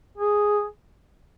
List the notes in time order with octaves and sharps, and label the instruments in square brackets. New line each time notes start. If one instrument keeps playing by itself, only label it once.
[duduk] G#4